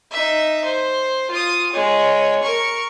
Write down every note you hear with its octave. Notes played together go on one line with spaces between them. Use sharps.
D#4 E5
C5
F4 D#6
G#3 C#5
A#4 C#6